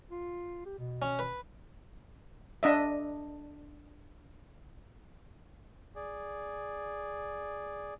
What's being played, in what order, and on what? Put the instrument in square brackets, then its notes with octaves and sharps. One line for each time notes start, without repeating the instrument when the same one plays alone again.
[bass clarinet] F4
G4
B2
[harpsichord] C#4
B4
[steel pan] D4 D#5 E5
[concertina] G#4 D5